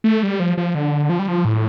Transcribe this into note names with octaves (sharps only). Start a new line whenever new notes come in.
A3
G3
F3
F3
D3
F3
G3
F3
A2